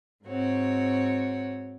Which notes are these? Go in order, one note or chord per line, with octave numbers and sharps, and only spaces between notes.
G#2 C4 F#4 C#5